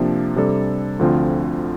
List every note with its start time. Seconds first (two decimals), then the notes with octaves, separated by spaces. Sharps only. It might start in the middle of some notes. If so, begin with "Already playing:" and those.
Already playing: C3 F3 A#3 D4
0.36 C3 G3 D4 A4 D5
0.99 D2 D3 F3 C4 F4